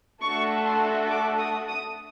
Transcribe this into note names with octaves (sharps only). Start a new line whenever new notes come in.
A3 D4 F#4 A4 C#6
C6
D6
D#6
D#6